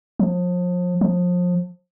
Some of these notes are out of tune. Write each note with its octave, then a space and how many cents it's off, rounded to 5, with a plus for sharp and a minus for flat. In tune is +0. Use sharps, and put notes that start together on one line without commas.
F3 +35
F3 +30